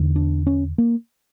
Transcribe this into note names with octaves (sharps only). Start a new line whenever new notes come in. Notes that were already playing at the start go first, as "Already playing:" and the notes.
Already playing: E2 D3
D4
C#4
A#3